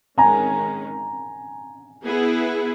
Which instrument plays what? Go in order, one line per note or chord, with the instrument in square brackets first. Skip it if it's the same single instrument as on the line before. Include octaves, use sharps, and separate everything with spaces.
[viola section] D#3 G#3 C#4 [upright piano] G#5 A#5
[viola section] B3 E4 G#4